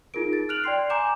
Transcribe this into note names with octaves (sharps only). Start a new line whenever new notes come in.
D#4 F4 G#4 A#4 D7
A6
F6 F#6 D7 F7 F#7
D5 G5 C6 C7
G#5 A#5 D6 G6 E7